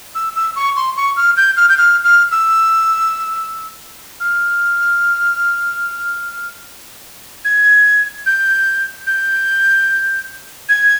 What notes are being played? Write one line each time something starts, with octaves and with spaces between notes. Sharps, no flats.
E6
E6
C#6
C6
C#6
F6
G6
F6
G6
F6
F6
E6
F6
G#6
G6
G6
G#6